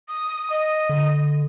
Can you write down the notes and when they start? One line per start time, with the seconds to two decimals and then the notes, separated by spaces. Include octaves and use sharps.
0.08 D#6
0.50 D#5
0.89 D3